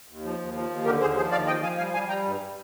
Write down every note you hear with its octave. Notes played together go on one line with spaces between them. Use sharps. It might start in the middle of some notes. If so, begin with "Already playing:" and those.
D#2
F3
D#2
F3
D#2
D3 G4 A#4
D#2 G#4 C5
F3 G#4 C5
D#2 D5 F5
F3 D#5 G5
F3 F5 G#5
G3 F5 G#5
G3 F5 G#5
G3 G5 A#5
G2